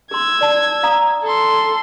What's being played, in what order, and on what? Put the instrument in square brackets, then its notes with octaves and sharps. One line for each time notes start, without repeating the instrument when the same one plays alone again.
[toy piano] G#4 C6 [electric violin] E6 G#6
[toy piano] D5 A5
F5 A#5 D#6
[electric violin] A4 C6